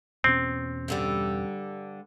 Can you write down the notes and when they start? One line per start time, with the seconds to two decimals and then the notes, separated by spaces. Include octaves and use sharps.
0.24 E2 B2 C4 C#4
0.88 G2 D3 G3